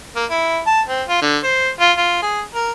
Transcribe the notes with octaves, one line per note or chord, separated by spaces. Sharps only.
A#3
E4
A5
C4
F4
D3
C5
F4
F4
G#4
A#4